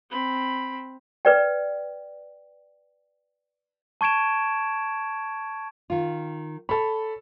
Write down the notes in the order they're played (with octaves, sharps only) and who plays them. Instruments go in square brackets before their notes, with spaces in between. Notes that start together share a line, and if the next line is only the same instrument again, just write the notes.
[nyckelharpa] C4 B5
[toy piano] B4 D5 G5
[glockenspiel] A5 C#6 G#6 D7 E7
[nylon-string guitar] D#3 F4
[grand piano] A4 B5 [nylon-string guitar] C#5